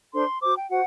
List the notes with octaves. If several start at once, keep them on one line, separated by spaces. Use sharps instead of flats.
D4 A4 C5 C6
F#4 C5 D6
G5
F#4 C5 F#5